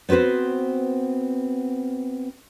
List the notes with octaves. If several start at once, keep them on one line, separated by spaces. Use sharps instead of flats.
B3 C4 F#4 B4 C5